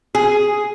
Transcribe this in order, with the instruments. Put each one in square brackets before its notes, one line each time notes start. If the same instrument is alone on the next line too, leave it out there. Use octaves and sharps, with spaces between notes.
[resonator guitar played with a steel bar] G#4